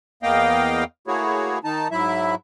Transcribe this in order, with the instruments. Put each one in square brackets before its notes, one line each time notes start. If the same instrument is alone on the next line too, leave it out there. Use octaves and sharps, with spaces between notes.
[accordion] E2 A#3 B3 D#5 F5 G5
A3 A#3 E4 F#4 G#4 C#5
D#3 D#4 A5
G#2 F#3 E4 E5